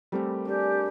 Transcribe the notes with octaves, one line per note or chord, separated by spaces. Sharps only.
G3 A3 C4 E4 G4 A#4
D4 G4 G#4